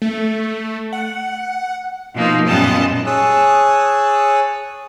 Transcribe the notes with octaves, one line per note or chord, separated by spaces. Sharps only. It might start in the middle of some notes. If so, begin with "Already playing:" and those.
A3
F#5
B2 F3 A#3 D#4 F4
F#2 A#2 G3 B3 D#5 A5
G#4 C#5 A5 D#6 E6 F#6